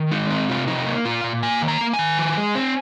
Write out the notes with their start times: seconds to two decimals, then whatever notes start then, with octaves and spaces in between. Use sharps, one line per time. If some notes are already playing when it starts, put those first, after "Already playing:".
Already playing: D#3
0.11 G#3 D#4
0.30 C4 D#4
0.49 C3 F4
0.68 F3 D#4
0.87 A#3
1.05 A#2 F4
1.24 A#2
1.43 A#3 G#5
1.62 D#3
1.68 A#5
1.81 A#3
1.93 G#5
1.99 D#3
2.18 F3
2.37 G#3
2.55 C4